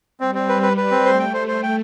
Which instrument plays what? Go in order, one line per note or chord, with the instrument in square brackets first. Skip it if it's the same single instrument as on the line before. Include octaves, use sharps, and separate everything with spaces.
[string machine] G3 [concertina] C4
[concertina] C4
B4
B4
B4
C4
[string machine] A3 [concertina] C5
[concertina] G5
C5
C5
G5